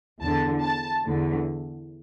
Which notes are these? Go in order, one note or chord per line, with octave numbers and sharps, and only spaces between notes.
E2 D3 A5
A5
E2 D3